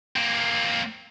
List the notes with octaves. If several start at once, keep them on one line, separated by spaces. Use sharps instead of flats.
A#3 C4